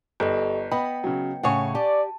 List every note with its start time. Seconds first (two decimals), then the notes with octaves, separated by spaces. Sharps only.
0.20 G1 G4 A4 D#5
0.72 B3 D#5 G5 B5
1.04 C#3 F#3
1.43 A2 C#3 C#5 F#5 G#5 C#6
1.75 G4 D5 A5